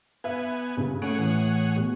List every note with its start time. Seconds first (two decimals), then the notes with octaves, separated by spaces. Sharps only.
0.24 B3 B4 E5 G#5
0.77 G2 A#2 C#3
1.02 A3 C#4 G#4 C#5 F#5 D7
1.18 A2 E3
1.75 B2 G#3